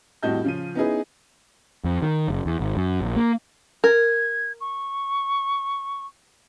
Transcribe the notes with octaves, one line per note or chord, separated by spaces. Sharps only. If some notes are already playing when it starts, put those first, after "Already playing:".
F2 A2 G3 F#4 D#5 G6
C#3 F3 D#7
B3 C#4 D#4 E4 G#4 B4
F2
D#3
F#1
E2
G#1
F#2
A#1
A#3
A#4 G#6
C#6